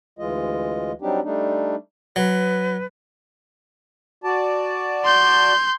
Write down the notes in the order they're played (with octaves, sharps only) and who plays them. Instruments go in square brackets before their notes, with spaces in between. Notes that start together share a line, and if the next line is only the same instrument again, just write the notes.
[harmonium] D2 E3 G#3 F4 D#5
F#3 G3 C4 D4 D#4 G4
G3 A3 D4 D#4
[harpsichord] F#3 [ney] B4
[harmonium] F#4 D5 A5
[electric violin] C6 G6